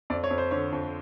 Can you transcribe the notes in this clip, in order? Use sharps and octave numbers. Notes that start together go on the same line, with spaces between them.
F2 D5
C#5
F2
C5
D3 C#5
F2